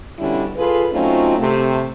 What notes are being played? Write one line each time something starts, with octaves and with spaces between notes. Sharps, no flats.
B2 D3 G3 C#4 D4 E4
F4 G#4 A4 B4
F#3 A3 C4 C#4 D#4 F4
C3 A3